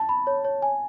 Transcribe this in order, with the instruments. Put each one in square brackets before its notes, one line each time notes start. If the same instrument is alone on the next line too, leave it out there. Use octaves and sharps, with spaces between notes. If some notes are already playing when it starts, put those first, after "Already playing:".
Already playing: [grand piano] A5
[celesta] B5
C#5
C#5
G#5